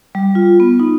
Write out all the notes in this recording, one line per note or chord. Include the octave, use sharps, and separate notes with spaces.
G3
F4
B3
D#4